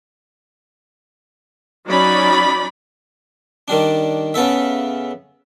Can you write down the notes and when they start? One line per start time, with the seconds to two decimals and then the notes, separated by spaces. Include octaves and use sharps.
1.87 F#3 C#4 D#4 D5 B5
3.68 D#3 G3 D4
4.34 C#3 B3 A4 E5